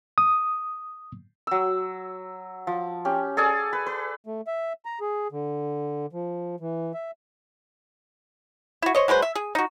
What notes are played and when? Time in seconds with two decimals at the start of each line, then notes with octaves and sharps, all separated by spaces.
0.18 D#6
1.47 F#3 E6
2.67 F3
3.05 C#4 G4
3.37 G#4 A4 D5 G#5
3.73 B4
3.86 B4
4.27 A3
4.47 E5
4.85 A#5
5.01 G#4
5.32 D3
6.13 F3
6.60 E3
6.94 E5
8.82 E4 F#4
8.95 C5 C#5 D#5
9.08 F#3 G#3 B4 C5
9.22 E5
9.35 G#4
9.55 D#4 F#4